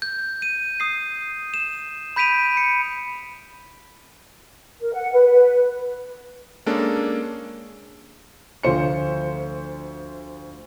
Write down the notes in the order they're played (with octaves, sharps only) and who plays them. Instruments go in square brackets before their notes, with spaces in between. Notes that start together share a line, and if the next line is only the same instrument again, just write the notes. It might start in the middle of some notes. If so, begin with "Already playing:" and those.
[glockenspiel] G6
D#7
D#6 C7
E7
B5 G6 B6 D7 D#7 F7
C#7
[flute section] A#4
F#5
B4
[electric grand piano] G#3 A#3 C#4 D4 A4
[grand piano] D2 F3 C5 C#7